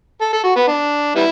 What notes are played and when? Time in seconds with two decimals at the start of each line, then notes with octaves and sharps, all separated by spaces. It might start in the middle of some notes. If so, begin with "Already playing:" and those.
0.21 A4
0.33 A4
0.44 F#4
0.56 B3
0.68 D4
1.15 G3 B3 E4